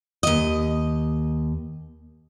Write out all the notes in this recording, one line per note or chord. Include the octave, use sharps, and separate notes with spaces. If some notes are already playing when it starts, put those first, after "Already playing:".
D#2 D#5